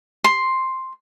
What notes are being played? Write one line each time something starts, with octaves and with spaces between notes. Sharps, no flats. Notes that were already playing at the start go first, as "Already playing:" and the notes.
C6